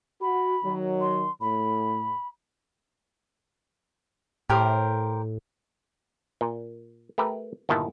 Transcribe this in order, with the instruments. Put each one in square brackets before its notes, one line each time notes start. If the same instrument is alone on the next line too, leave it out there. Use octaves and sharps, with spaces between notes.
[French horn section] F#4 [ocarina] B5
[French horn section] D#3 F#3
[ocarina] C6
[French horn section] A2 [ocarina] B5
[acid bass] A2 [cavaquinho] G4 A#4 C5
[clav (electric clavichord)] A#2
A3 G4 A#4 B4
G1 A#2 D#3 E4 A5